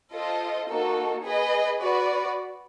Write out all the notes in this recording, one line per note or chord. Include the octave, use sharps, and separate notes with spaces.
F4 A4 C5 D#5
A#3 D#4 F#4 A4
G#4 B4 D#5
F#4 B4 D5